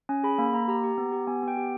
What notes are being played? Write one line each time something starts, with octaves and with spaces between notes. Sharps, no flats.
C#4 G#5
G#4 B5
A#3 B5
A#3 A#5
G4 A#5
G4
B3
G4
B3 G#5
B3 G5
G4